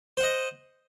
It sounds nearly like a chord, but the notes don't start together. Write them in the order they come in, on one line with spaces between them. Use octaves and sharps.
C5 F#5 D#5